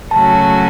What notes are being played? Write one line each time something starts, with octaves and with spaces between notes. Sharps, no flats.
C#3 F#3 A3 C#4 F#4 A5